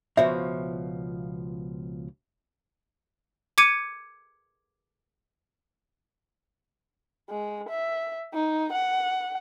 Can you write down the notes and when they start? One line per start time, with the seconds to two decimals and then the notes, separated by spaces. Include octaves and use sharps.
0.17 C#2 B2 F3 E5
3.58 D6 G#6 C#7 D#7
7.30 G#3
7.69 E5
8.34 D#4
8.73 F#5